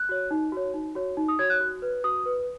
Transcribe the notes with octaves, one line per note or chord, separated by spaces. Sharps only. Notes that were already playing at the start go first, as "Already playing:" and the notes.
Already playing: F#6
F#4 C#5
D#4
F#4 C#5
D#4
F#4 C#5
D#4
D#6
F#4 C#5 G#6
F#6
F#4
B4
F#4 D#6
B4